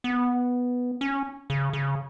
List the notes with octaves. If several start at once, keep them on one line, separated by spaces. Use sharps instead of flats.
B3
C#4
C#3
C#3